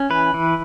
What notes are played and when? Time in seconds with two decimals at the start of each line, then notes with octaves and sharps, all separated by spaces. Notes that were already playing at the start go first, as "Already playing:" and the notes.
Already playing: C#4
0.10 E3 B4
0.34 E3